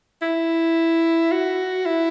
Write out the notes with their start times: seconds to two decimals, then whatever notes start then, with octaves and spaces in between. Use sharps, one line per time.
0.22 E4
1.32 F#4
1.86 E4